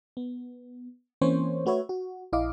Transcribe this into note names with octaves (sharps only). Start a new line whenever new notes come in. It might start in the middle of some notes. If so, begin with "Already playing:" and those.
B3
E3 A#3 C4 C#4 C5 C#5
A3 F#4 B4 C#5 E5
F#4
A#1 E4 D#5 F5 D6